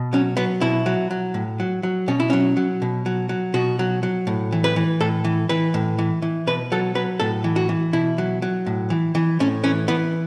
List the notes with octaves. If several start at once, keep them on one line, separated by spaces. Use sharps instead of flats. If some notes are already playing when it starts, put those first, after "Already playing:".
Already playing: B2
F#3 C#4
F#3 B3
B2 E4
F#3
F#3
A2
F#3
F#3
B2 C#4
E4
F#3 C#4
F#3
B2
F#3
F#3
B2 F#4
F#3
F#3
A2
E3
B4
E3
A2 A4
E3
E3 B4
A2
E3
E3
B2 B4
F#3 A4
F#3 B4
A2 A4
E3
F#4
E3
B2 E4
F#3
F#3
A2
E3
E3
A2 C#4
E3 C#4
E3 B3